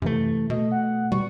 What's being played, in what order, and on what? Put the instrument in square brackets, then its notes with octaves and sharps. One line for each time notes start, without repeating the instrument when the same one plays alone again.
[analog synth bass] F#2 [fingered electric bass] C3 E3 A3
[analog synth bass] B2 [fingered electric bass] A3 [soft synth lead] D#5
[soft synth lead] F#5
[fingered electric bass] B2 [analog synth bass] G3 [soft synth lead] C#6